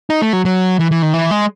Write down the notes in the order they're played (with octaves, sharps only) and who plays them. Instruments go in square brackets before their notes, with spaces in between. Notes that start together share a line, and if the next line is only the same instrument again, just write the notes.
[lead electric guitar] D#4
A3
F#3
F#3
E3
E3
D#3
E3
G#3